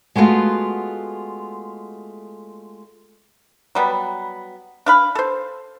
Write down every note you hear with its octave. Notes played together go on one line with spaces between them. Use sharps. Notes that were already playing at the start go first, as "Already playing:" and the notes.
G#3 A3 B3 C#4 F4 F#4
F#3 G3 B3
D4 F5 B5
A4 C5